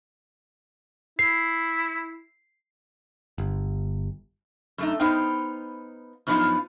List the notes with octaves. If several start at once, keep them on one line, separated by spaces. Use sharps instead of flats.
E4 C7
G1
F#2 A3 D#4
B3 D#4 C5 F5 G5
F#2 F3 B3 C#4 D#4 F4